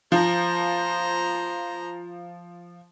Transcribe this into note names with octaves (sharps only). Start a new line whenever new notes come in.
F3 C5 A#5